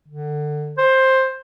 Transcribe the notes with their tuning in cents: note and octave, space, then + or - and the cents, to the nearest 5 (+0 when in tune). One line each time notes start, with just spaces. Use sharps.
D3 +25
C5 +10